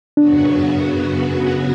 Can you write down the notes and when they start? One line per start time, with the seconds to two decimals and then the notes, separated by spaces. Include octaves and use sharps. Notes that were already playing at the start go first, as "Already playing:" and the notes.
0.17 F#2 C#3 F#3 B3 D4 F#4